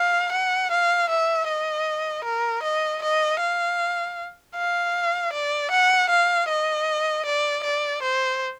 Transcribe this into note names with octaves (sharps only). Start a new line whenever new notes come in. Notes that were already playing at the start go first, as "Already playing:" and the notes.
Already playing: F5
F#5
F5
E5
D#5
A#4
D#5
D#5
F5
F5
D5
F#5
F5
D#5
D5
D5
C5